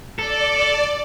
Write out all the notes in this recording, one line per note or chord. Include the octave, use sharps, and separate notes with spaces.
A4 D5